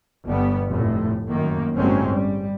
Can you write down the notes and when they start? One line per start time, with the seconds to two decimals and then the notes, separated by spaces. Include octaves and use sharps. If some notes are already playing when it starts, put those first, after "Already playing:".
0.25 G1 G3 B3
0.68 F1 A2
1.29 F#2 D#3 A#3
1.77 G1 A2 F#3 G#3 C4 C#4
2.11 G3